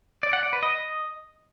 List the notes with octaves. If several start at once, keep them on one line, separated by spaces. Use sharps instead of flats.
D5
F#5
D5
B4
D#5